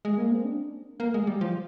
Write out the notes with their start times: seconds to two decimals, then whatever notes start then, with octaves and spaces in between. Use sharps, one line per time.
0.05 G#3
0.18 A#3
0.32 C4
0.45 D4
1.00 A#3
1.14 G#3
1.27 G3
1.41 F3